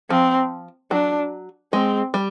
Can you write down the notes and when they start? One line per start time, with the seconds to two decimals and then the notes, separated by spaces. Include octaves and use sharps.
0.10 F3 C4
0.91 F#3 D4
1.73 G#3 C4
2.14 G3